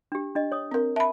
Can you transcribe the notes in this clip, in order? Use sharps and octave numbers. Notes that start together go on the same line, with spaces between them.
D4 G4
D4 D#5
C#5 D#6
C4 A#4
E5 A5 B5